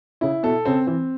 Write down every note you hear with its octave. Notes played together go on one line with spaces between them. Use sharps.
C#3 E4
B2 A4
C#3 C4
E3 C4